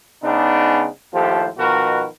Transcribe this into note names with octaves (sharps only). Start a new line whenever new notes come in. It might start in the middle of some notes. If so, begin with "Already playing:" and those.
C#3 G#3 B3 D4 D#4
D#2 A2 F3 G4 A4 C5
B2 D#3 F3 F#4 A#4 B4